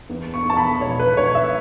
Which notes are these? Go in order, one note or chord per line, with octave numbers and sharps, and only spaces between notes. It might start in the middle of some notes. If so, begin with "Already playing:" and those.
E2
C#6
E2 A5
B5
E1 C#5
B4
E1 C#5
E5